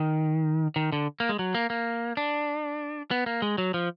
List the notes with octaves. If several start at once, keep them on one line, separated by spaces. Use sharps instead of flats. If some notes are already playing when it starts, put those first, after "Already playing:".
Already playing: D#3
D#3
D3
A#3
G#3
F#3
A#3
A#3
D4
B3
A#3
G#3
F#3
F3